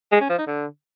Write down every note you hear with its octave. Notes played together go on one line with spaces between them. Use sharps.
G#3
C#4
F3
D#4
D3